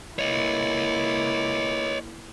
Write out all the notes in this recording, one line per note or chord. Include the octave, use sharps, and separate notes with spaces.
A#3 E4 C#5 D#5